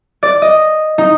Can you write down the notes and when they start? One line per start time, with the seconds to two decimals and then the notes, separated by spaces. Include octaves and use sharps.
0.23 D5
0.42 D#5
0.98 D#4